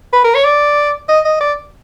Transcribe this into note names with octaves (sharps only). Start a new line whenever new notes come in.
B4
A#4
C#5
D5
D#5
D#5
D5